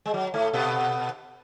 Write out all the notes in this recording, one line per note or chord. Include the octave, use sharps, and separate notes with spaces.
G#3
F#3
A2 A3
B2 B3